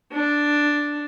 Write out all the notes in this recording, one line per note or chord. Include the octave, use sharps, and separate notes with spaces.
D4